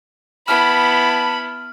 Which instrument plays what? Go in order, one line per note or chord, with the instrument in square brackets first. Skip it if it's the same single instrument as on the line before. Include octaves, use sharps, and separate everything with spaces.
[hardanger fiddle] B3 E4 [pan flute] A5 [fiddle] B5 [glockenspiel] F6